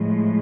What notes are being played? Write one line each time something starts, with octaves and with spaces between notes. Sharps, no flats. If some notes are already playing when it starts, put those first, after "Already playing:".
Already playing: A2 F3 G#3